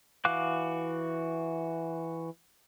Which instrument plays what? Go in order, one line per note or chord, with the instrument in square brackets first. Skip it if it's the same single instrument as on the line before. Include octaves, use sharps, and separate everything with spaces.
[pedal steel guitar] E3 F#4 F5 D6 F#6